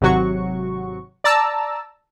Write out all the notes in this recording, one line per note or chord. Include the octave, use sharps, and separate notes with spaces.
G#1 C3 F#3 F#4 C#6
D5 A5 A#5 E6